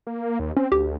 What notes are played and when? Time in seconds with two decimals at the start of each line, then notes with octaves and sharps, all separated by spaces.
0.07 A#3
0.40 D#2
0.57 C4 C#4
0.72 D2 G4